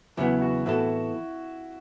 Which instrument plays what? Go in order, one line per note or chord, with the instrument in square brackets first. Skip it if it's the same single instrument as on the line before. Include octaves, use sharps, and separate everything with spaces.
[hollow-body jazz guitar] E2 C#3 F#3 B3 [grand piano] E4
[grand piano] F#4
[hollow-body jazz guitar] A2 E3 B3 F#4 A4 [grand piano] E4